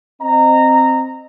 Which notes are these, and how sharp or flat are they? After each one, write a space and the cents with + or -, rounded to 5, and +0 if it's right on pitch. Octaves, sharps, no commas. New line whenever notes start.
C4 +0 D#5 -20 A#5 -15